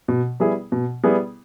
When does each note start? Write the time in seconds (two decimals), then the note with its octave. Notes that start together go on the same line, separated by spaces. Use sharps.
0.08 B2
0.40 G3 B3 E4 G#4
0.72 B2
1.04 G3 B3 E4 G#4